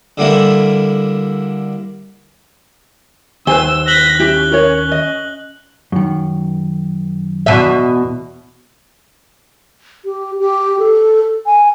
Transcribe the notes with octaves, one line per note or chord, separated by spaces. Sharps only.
D3 G3 A#3 E4
D#2 B4 C5 G#5 E6 G7
F#6 A#6 B6 F#7 G7
C#4 E4 G4 E5
A#4 C#5
D#5
F#2 D#3
E2 B2 E5
G4
G4
A4
G#5